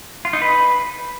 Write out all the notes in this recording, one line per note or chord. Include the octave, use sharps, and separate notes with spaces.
F4
D#4
B4